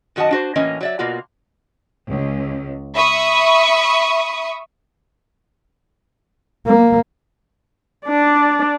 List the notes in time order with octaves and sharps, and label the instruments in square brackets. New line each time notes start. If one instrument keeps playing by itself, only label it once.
[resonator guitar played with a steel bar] F#2 D#3 F#4 D#5 F#5 A5
D4 F#4 C5
A2 E3 A#3 C#4 D#5
F#3 D5 E5
B2 A#3 F4 F#4
[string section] C#2
E5 B5 C#6 D#6
[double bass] A#3
[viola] D4 D5